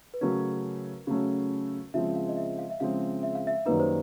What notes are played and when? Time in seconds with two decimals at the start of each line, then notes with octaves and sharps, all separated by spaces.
0.14 B4
0.21 C#3 F#3 A3 C#4 A#4
1.07 C#3 F#3 A3 C#4
1.94 C#3 F3 G#3 C4 E5
2.15 F5
2.29 D#5
2.37 E5
2.59 F5
2.70 E5
2.80 C#3 F3 G#3 C4 F5
3.23 E5
3.35 F5
3.47 E5
3.66 F#2 D#3 G3 A#3 D#4 B4
3.80 C5